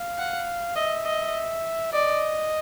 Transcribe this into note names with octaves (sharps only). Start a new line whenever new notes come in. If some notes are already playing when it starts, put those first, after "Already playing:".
Already playing: F5
F#5
D#5 E5
D#5
D5 D#5